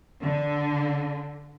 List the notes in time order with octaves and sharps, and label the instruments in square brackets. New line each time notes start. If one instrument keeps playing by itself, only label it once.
[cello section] D3